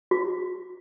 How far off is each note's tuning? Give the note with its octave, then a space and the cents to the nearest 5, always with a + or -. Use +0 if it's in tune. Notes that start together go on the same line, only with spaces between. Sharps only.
F#4 -25